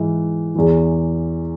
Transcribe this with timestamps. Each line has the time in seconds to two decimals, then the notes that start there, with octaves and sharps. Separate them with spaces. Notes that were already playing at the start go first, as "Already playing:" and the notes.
Already playing: G#2 E3
0.55 E2 E3